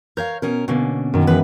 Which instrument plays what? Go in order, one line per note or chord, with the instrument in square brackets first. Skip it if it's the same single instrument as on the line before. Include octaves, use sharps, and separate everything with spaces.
[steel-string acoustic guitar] A#4 C#5 F5 [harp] G6
[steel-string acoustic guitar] B2 C#4 A#4
[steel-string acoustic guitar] B2 D3 A#3 [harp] C#4
[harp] F#2 D#3
[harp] E3 [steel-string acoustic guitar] G#3 B4